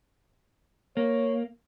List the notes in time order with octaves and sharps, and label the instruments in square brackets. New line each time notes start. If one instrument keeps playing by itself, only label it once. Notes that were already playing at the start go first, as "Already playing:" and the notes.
[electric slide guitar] A#3 [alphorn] C#5